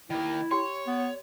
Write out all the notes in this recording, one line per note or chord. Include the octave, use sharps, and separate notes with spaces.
D#3 A#3 E4
G4 C#5 G5 C6
B3